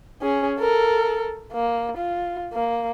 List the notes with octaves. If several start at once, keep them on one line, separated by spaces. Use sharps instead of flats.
C#4 G#4
A4 A#4
A#3
F4
A#3